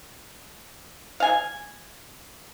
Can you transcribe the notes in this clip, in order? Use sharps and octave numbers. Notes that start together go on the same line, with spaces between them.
F5 G#5